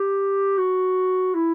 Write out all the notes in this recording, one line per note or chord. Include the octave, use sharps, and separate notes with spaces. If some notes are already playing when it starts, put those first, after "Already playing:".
Already playing: G4
F#4
E4